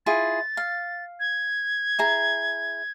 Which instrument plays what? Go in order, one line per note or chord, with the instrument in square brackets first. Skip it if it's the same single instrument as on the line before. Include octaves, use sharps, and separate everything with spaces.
[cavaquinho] E4 F4 G#4 [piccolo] A6
[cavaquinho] F5
[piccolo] G#6
[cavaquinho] E4 G#4 A#5